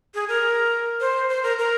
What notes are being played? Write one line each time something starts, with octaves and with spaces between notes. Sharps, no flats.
G#4
A#4
C5
C5
A#4
A#4